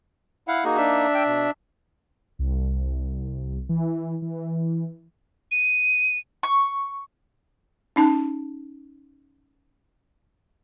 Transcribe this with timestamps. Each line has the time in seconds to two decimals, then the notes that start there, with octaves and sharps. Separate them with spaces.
0.48 E4 F5 F#5
0.64 A#3 D#4 F#4 G#4
0.77 D4 E5
1.15 G5 E6
1.27 B2
2.39 C2
3.69 E3
4.22 E3
5.51 D#7
6.43 C#6
7.96 C#4 D#4 A5